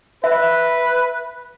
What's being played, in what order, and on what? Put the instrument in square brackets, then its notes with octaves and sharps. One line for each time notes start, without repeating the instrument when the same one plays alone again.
[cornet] B4 [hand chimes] E5